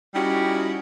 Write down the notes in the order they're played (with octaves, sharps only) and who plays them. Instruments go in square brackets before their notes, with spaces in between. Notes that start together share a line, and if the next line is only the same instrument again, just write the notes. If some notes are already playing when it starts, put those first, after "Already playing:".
[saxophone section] G3 C#4 D#4 E4 F#4 G4